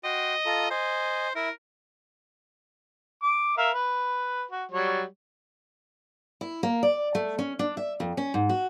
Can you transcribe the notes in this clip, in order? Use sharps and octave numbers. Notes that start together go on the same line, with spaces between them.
F#4 D#5 G5 C6
F4 A4 A#5
C5 D#5 G#5
E4 A#4 E5
D6
A#4 E5 F5
B4
F#4
F#3 G3 C#5
E4
A#3
D5
A3
C#4
D4
E5
F2
C#4
G#2
F#4